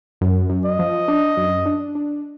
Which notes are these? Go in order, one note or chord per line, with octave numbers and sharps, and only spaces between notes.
F#2
F#2
D#5
F3
D4
F#2
D4
D4